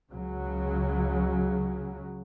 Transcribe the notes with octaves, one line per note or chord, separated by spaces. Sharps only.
C#2 C#3 F#3